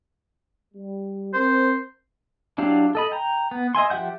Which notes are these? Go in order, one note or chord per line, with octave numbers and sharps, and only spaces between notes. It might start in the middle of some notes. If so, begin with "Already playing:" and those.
G3
C4 A#4 C5
F#3 D4 E4 G4 F5
A4 D#5 B5
G5 A#5
B3
D#5 E5 G#5 C6
F3 G4 E5 F#5 G6